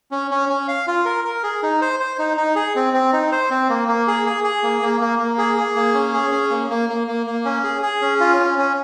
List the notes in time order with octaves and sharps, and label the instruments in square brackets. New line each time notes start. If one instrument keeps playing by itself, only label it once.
[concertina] C#4
C#4
C#4
F5
F4
A#4
A#4
G#4
D#4
C5
C5
D#4
D#4
G#4
C4
C4
D#4
C5
C4
A#3
A#3
G#4
G#4
G#4
A#3
A#3
A#3
A#3
G#4
G#4
A#3
C#4
G#4
C#4
A#3
A#3
A#3
A#3
A#3
C#4
G#4
G#4
C#4
F4
C#4
C#4